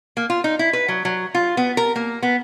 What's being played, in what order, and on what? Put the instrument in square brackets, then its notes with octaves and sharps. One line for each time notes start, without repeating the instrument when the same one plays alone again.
[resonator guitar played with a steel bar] A#3
F4
D#4
E4
B4
F#3
F#3
F4
B3
A#4
A#3
B3